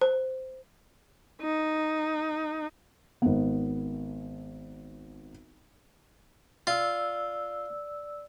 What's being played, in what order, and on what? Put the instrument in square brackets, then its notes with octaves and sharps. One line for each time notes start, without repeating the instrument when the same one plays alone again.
[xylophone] C5
[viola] D#4
[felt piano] G#1 B3
[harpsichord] F4 [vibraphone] D5 E6